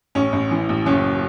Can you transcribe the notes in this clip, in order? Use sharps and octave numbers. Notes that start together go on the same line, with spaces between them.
A1 C#4
A1
E3
A1
F#1 C#4